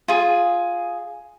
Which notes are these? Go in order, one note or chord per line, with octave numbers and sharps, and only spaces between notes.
F4 G#4